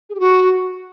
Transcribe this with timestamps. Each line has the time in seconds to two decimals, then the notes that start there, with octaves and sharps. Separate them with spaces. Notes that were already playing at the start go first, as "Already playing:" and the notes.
0.09 G#4
0.15 G4
0.20 F#4